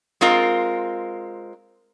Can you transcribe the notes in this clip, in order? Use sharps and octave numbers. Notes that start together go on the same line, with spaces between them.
G#3 C4 F4 A#4